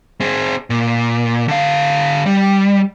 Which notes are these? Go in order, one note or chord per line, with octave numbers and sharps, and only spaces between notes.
C4 G#4
A#2
D3 F5
G3